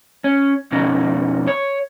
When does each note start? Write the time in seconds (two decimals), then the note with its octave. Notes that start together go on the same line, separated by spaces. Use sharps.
0.24 C#4
0.71 F2 B2 C#4 D#4
1.47 C#5